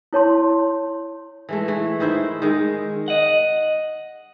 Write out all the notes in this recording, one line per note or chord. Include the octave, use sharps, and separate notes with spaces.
E4 C#5 A5 C6
E3 G#3 A3
E3
D#3 E4 C5
D#3 G#3
D#5 F#5